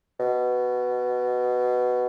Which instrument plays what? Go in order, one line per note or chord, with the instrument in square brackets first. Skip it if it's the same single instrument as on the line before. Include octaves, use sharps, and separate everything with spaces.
[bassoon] B2